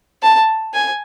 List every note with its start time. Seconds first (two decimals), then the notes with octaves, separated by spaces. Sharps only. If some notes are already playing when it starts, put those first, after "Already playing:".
0.23 A5
0.74 G#5